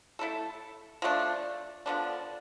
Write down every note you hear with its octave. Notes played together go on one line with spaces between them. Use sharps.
A3 E4 A4
F3 A3 D4
D3 F3 B3 D4